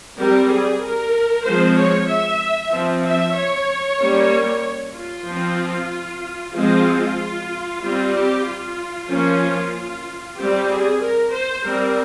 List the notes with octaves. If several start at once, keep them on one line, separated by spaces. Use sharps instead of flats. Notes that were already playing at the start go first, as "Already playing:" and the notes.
G3 C4 A#4
G#4
A#4
F3 G#3 C4 C5
C#5
E5
F3 C4
E5
C#5
G3 A#3 C#4
F4
F3 C4
F3 G#3 C4 F4
G3 C4 F4
G4
F4
F3 A#3 C#4
G3 C4 G4
G#4
A#4
C5
G3 C4 A#4